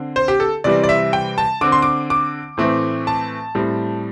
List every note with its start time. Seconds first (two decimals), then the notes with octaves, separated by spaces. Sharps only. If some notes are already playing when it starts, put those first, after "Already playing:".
Already playing: D3 C4
0.16 C5
0.28 G4
0.40 A4
0.64 C3 E3 G3 C4 D5
0.84 D5
0.89 E5
1.13 G5
1.38 A5
1.61 D3 C4 D6
1.72 C6
1.82 D6
2.10 D6
2.58 A2 E3 A3 C4
3.07 A5
3.55 A2 G3 C4